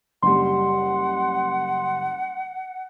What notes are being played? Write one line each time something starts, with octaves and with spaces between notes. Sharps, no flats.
F#1 G3 F#5 C6